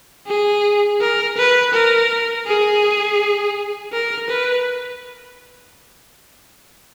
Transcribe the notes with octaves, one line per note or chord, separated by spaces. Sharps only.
G#4
A#4
B4
A#4
G#4
A#4
B4